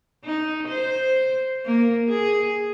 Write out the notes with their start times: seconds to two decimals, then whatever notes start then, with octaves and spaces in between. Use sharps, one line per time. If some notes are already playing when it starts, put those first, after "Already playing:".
0.24 D#4
0.68 C5
1.65 A#3
2.09 G#4